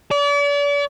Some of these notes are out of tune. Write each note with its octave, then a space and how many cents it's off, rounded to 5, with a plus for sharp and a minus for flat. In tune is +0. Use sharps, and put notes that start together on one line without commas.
D5 -40